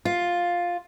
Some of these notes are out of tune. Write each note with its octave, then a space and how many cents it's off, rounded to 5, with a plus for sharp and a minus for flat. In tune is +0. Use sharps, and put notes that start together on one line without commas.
F4 +5